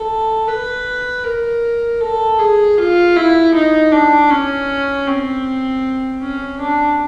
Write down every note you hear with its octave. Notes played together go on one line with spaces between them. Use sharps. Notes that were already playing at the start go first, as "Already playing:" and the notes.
Already playing: A4
B4
A#4
A4
G#4
F4
E4
D#4
D4
C#4
C4
C#4
D4